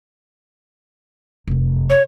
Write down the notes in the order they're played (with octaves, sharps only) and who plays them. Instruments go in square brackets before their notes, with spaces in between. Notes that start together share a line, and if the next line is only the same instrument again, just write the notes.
[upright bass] F1 F#2
[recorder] C#5